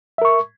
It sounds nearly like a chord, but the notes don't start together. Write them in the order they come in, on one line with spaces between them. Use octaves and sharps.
E5 A#4 C#6